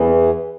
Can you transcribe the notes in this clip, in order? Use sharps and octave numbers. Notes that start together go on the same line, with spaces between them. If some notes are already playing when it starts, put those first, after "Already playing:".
Already playing: E2 E3